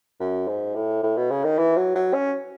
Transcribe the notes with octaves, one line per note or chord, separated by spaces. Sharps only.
F#2
G#2
A2
A2
B2
C#3
D#3
E3
F#3
F#3
C#4